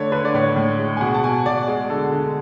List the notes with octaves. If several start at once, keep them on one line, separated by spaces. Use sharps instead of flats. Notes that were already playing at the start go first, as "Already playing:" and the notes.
Already playing: D3 A3 C#5 D5
D3 B4
D5
A2 C#5
A2
G#3
G#5
B2 F#5
A5
B2 G#5
B2 D5
G#3
D3 A4
D3